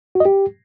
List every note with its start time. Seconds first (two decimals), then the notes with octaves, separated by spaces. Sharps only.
0.15 F#4
0.20 D#5
0.25 G4